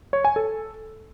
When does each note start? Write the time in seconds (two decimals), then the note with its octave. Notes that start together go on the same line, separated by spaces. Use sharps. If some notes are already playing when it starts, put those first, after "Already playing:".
0.13 C#5
0.25 G#5
0.36 A4